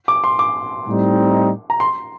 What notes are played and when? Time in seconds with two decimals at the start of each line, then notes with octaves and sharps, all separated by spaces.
0.08 D6
0.24 C6
0.39 D6
0.87 A2 G3 C4 D#4
1.70 A#5
1.80 C6